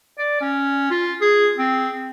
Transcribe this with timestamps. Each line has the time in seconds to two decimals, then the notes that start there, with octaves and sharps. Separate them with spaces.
0.19 D5
0.41 C#4
0.91 F4
1.21 G#4
1.58 C4